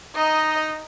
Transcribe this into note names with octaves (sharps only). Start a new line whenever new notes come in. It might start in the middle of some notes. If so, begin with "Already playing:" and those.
D#4 D#5 A#5